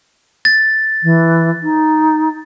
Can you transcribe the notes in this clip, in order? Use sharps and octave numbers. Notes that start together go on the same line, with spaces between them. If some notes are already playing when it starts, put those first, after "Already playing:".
A6
E3
D#4